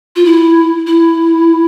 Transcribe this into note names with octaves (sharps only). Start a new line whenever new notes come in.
F4
E4
E4